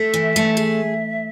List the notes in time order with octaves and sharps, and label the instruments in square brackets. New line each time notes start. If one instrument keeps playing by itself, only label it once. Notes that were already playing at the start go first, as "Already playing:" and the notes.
Already playing: [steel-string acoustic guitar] A3 [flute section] E5
[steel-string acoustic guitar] E3
A3
[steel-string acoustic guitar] G#4 [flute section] E5